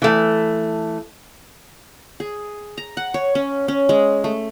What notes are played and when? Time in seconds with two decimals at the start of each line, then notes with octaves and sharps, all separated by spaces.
0.02 E3 A3
2.20 G#4
2.78 A#5
2.97 F#5
3.14 C#5
3.35 C#4
3.68 C#4
3.89 G#3
4.24 A3